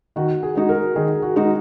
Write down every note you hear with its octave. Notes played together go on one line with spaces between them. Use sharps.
D#3 F#4
G#4
G#3 D#4 F#4
A#4
D#3 G#4
F#4
G#3 D#4 F#4